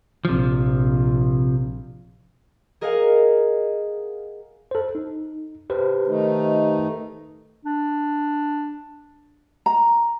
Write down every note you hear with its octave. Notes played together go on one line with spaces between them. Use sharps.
A#1 C3 F3
G#4 A#4 D#5 F5 F#5 G#5
A4 C5
D#4
G4 B4 C5
D#3 A3 D#4
D4
A#5